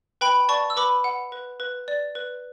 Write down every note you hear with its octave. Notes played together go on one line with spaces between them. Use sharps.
B4 G5 B5
D5 A5 C#6
E6
B4 B5 D6
F#5
B4
B4
D5
B4